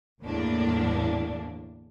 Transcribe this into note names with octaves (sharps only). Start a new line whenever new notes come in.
G1 E2 A2 A#3 D4